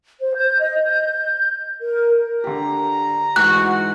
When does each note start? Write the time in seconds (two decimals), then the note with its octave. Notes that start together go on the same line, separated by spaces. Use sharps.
0.20 C5
0.36 G6
0.59 D#5
0.84 G6
1.82 A#4
2.44 D3 G4 A#5
3.36 G#2 E3 D#4 F#4 F#6